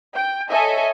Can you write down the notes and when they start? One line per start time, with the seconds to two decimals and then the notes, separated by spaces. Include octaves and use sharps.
0.15 G5
0.50 A4 C#5 D#5 E5 G#5